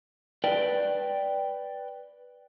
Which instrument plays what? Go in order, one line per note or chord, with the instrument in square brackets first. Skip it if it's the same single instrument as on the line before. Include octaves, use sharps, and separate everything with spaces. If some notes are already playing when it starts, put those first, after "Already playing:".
[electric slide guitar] B4 D5 G5